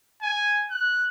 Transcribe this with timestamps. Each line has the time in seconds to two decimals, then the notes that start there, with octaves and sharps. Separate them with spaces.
0.22 G#5
0.71 F#6